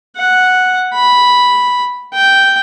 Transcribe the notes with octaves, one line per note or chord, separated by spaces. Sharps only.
F#5
B5
G5